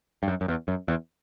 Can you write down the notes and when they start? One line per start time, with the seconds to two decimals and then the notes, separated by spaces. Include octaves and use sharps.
0.23 G2
0.28 F#2
0.41 F#2
0.48 E2
0.68 F#2
0.88 E2